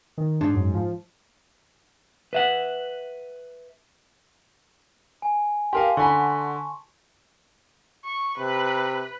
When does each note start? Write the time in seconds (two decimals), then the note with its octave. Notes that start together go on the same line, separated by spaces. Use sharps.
0.18 D#3
0.41 G#2 D4
0.55 F#2
0.74 F3
2.33 B4 E5 F#5
5.22 G#5
5.73 G4 A#4 F5 A5 C6
5.97 D3 F#5 G#5 B5 C#6
8.05 C#6
8.38 C3 B4